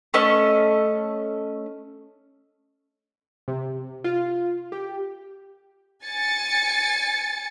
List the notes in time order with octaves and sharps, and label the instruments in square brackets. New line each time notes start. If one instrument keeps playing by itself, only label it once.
[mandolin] A3 C#4 D#5
[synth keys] C3
F4
G4
[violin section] G#5 A6 C#7